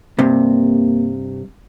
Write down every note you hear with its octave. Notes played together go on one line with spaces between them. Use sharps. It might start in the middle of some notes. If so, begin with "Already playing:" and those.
G2 C3 A#3